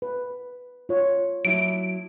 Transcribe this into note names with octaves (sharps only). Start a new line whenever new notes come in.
B4
F4 C#5
F#3 E4 D7